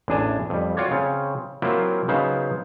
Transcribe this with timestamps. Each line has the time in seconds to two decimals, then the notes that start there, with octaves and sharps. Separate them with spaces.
0.08 A1 E2 D4 G#5 A5
0.50 F2 G3
0.77 F4 F#4 C#5 D5
0.91 C#3 C4 C#4
1.62 F#3 A#3 C4 E4 F4
2.08 C#3 F#3 B3 D#4 C5 F5